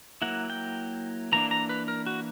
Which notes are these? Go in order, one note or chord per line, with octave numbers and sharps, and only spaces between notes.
F#3 A#3 E4 F#5
G5
E3 A#3 D4 A#5
A#5
B4
A#4
F#4